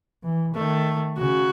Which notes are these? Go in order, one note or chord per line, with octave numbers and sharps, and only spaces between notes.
E3
D#3 A3
C#3 F#4